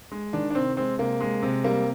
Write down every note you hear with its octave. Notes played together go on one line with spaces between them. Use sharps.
G#3
D#3 D4
D4
C3 C4
G#3 C4
C3 A#3
G#3
C3
G3 A#3